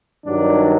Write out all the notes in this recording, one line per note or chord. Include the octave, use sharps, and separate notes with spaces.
G2 D#3 F#3 D4